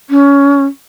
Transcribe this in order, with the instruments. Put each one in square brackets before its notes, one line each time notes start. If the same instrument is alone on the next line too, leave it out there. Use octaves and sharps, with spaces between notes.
[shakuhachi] C#4